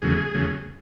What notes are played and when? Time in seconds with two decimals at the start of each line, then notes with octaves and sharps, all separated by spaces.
0.02 E2 C#3 F#3 A3 G#4
0.34 E2 C#3 F#3 A3